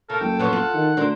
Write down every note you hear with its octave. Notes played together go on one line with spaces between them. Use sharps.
C#3 A4 A#4
F#1 G5
F3 B3 C#5 F#5
F4
D#3
D2 D3 A#4 C5